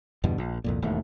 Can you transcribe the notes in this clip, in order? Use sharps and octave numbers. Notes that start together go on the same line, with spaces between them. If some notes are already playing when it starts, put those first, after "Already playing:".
E2 G2 B2 D3
A#1
C2 F2 A#2
E1 D#2 G#2 A3